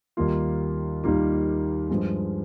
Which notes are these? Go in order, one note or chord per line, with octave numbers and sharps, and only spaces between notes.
D#2 D#3 G3 A#3 F4
D#2 D#3 G3 A#3 F4
G2 F3 G#3